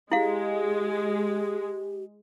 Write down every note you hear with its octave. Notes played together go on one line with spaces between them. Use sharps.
G#3 E4 G4 F5